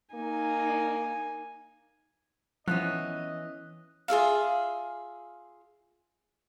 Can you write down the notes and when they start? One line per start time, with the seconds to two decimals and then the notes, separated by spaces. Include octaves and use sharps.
0.15 A#3 D#4 G#5
2.68 E3 F3 B3 C#4 D#5 F#6
4.08 F4 G#4 E5 F5